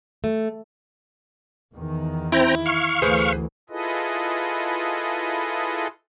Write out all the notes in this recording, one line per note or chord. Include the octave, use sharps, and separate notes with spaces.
A3
E2 D#3
C4 E4 G5 A#5
F5 C#6
D2 E3 G#4 B4 C5
E4 F4 G#4 A4 B4 D#5